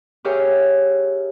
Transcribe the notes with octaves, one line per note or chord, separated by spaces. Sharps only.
G4 G#4 A#4 C#5 E5 F5